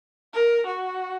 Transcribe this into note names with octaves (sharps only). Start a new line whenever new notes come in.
A#4
F#4